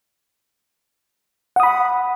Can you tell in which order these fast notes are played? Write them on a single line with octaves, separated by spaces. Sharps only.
F#5 D#6 B5